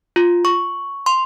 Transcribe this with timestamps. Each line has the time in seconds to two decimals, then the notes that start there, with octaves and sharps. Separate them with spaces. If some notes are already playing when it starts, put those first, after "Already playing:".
0.16 F4
0.45 C#6
1.06 C6